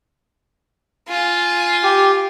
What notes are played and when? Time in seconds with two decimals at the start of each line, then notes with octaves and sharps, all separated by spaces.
1.08 F4 G#5
1.84 G4